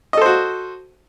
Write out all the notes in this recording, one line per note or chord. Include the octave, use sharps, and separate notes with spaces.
F#4 A4 C5 D#5